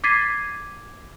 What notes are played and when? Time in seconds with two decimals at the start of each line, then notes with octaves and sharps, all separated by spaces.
0.04 D6 G#6 A6 B6 C7 D#7